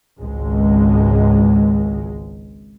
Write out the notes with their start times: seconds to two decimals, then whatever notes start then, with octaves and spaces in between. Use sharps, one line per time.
0.20 G#1 C#2 G#3